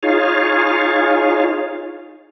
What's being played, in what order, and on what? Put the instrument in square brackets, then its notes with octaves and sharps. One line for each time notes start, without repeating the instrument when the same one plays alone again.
[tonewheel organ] D#4 F4 G#4 C#5 F5